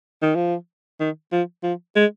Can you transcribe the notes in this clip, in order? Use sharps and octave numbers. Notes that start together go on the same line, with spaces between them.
D#3
F3
D#3
F3
F3
G#3